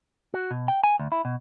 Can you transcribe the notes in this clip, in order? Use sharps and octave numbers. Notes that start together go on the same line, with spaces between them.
F#4
B2
G5
G#5
D2
E4
B2